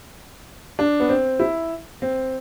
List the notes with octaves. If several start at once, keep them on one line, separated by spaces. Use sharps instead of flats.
D4
B3
C4
E4
C4